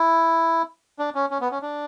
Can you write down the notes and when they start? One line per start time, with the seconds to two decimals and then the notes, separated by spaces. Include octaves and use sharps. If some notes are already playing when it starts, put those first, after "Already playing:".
Already playing: E4
0.99 D4
1.15 C#4
1.31 C#4
1.41 B3
1.51 C#4
1.62 D4